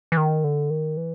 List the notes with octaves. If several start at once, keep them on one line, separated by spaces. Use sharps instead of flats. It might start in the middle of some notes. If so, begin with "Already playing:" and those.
E3
D#3
D3
D#3
E3